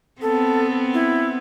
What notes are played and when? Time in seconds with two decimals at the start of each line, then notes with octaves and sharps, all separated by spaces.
0.22 B3 C4 A4
0.94 E4